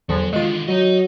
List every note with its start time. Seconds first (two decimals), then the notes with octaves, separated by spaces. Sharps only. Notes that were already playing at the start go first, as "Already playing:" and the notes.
0.09 E2 D3 F3 F#3
0.33 D3 D#3 G#3 F4
0.68 F#3 D#5 A#5